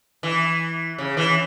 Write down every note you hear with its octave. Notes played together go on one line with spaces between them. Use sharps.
E3
C#3
E3